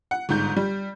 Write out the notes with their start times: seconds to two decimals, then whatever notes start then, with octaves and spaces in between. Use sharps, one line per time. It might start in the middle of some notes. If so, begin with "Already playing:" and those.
0.11 F#5
0.29 G1 G#2 G6
0.56 G3